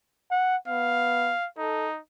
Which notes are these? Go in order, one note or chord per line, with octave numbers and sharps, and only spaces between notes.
F#5
B3 F5
D#4 A4